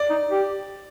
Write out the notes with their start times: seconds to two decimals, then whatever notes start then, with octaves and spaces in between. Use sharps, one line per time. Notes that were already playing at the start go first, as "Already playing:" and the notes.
Already playing: D5
0.10 D#4
0.31 G4